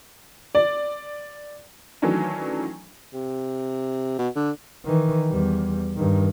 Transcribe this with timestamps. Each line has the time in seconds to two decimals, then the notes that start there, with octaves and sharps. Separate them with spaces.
0.55 D5
2.02 D#3 E3 F#3 A3 C#4 D4
3.14 C3
4.19 B2
4.36 D3
4.85 D#3 E3
5.30 E2 G3
5.96 G2 D#3